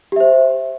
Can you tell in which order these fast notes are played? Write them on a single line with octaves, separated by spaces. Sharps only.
G4 E5 C5